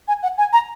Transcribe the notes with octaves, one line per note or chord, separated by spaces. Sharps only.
G#5
F#5
G#5
A#5